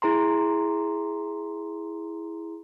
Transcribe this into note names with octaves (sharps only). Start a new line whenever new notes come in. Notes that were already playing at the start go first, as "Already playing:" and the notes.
E4 G#4 A#5 C6